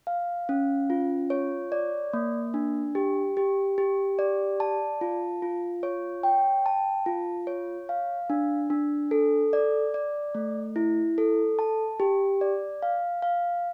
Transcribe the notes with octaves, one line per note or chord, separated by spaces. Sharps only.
F5
C#4
F4
C#5
D5
A#3
D4
G4
G4
G4
D5
A5
F4
F4
C#5
G5
A5
F4
C#5
F5
D4
D4
A4
D5
D5
A3
E4
A4
A5
G4
D5
F5
F5